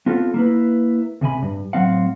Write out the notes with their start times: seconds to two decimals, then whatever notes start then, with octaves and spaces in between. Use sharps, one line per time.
0.06 B3 C4 F4 A4
0.34 A#3 E4 B4
1.21 C#2 C3 G#5 B5
1.42 G2
1.73 A2 F#3 C4 F5 F#5